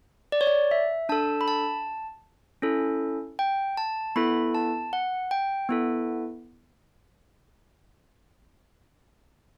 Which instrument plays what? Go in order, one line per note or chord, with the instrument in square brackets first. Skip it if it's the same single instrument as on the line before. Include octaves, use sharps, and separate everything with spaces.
[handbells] D5
C#5
D5
E5
D4 A4 A5
B5
A5
C#4 E4 A4
G5
A5
B3 E4 A4 B5
A5
F#5
G5
B3 E4 A4